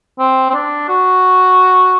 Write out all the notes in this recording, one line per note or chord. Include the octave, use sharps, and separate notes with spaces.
C4
C4
D4
F#4